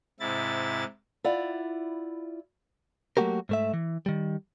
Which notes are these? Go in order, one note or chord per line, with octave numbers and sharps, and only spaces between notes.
G#2 C3 E4 A6
E4 F4 D5 F#5
F#3 A3 A#3 F#4 G4 A#4
G#2 A3 E5
E3
D#3 G3